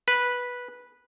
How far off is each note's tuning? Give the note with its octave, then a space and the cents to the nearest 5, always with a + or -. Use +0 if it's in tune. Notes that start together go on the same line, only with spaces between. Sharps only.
B4 -10